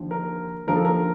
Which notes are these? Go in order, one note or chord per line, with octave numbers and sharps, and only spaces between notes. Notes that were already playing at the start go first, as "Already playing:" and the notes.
Already playing: D#2 D3 F3
A#4
D#2 D3 F3 A#4
A4
A#4